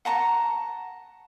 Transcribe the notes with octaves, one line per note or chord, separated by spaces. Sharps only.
F#5 A5 A#5 C#6